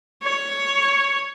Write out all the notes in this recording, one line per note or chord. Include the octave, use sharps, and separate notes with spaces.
C#5